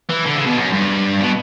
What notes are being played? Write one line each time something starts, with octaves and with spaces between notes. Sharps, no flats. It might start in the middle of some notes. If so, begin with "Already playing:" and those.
E3
D3
C#3
B2
F#2
G2
B2